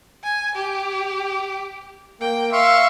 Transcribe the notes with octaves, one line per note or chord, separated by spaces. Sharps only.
G#5
G4
A#3 G5
E5 F5 C6 C#6